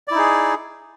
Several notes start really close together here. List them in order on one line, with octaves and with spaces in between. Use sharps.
D5 E4 D#4 G#4